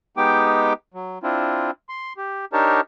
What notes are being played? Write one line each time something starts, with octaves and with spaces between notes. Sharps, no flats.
G#3 B3 D#4 G4 G5 D6
F#3
C4 D4 E4 F4
C6
G4
D4 D#4 G4 A#4 C#5 A5